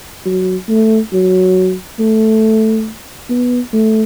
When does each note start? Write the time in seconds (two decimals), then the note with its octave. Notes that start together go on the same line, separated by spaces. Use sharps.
0.25 F#3
0.68 A3
1.13 F#3
1.99 A3
3.30 B3
3.73 A3